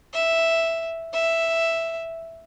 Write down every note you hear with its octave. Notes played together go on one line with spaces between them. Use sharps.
E5
E5